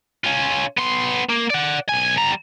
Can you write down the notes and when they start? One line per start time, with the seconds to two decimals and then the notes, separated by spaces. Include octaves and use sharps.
0.24 C#4 F4
0.78 B3 C6
1.30 A#3
1.50 D5 F#5
1.89 B1 G#5
2.17 G3 A#5